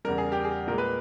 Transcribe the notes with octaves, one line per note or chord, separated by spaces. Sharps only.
E2 C#3 G3 A#4
G#4
G4
G#4
A#2 G#3 A#4
B4